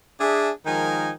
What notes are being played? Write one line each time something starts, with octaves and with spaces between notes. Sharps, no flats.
D4 G#4 E5
D#3 F3 G#3 D#4 A#4 G#5